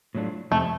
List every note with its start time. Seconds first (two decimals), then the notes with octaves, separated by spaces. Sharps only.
0.15 A2 F#3 A3 D4 F4
0.51 F2 C3 A3